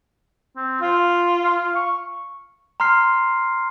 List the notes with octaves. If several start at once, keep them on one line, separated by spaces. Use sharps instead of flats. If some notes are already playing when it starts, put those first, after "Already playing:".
C4
F4 F5
F5
C#6
A#5 C6 F6 C7